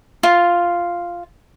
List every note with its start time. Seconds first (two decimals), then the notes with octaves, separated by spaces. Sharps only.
0.23 F4